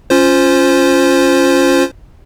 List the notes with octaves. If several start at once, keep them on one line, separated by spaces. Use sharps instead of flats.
C#4 F4 C5